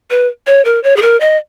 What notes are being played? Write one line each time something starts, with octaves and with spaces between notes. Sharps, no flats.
B4
C#5
A#4
C#5
G#4
A#4
D#5